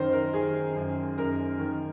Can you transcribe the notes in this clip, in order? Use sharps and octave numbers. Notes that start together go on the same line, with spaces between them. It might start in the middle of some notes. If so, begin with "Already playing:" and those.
Already playing: F#2 D#3 A#4 C5
A#4
D#3 G#4
F#2
F#2 A#4
D#3